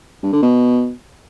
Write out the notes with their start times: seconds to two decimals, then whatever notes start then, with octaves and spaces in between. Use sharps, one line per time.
0.23 G2
0.33 D3
0.42 B2